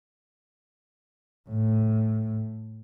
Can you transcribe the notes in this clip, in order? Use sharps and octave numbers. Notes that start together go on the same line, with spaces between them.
A2